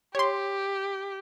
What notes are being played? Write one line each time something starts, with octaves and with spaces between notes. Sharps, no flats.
G4 C#5 C6